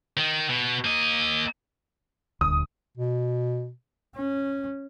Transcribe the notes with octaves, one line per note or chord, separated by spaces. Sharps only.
D#3
B2
A#3 D#5
D#1 D2 D#6
B2
C#4